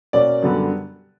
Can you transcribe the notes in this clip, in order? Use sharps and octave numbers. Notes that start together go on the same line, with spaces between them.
B2 A#3 C#4 D5
F#2 D3 G3 B3